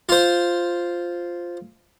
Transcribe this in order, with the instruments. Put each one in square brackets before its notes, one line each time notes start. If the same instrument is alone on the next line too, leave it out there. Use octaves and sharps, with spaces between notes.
[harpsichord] F4 C5